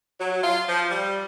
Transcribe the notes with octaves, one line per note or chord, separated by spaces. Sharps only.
F#3
F4
F3
G3